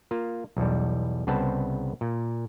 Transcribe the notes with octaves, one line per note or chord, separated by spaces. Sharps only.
A#3 F4
B1 E2 G3
C2 C#3 B3 C4 C5 A5
A#2